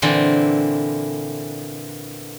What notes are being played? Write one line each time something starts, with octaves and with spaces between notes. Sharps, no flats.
A#2 D3 E3 C4